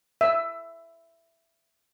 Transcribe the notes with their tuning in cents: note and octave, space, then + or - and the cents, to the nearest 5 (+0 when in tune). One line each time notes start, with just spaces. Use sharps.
E5 +10